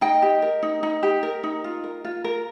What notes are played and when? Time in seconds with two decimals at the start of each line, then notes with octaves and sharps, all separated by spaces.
0.01 D#4 D#5 G5
0.22 G4
0.42 A#4
0.63 D#4
0.83 D#4
1.03 G4
1.23 A#4
1.43 D#4
1.64 F4
1.84 A#4
2.05 F4
2.24 A#4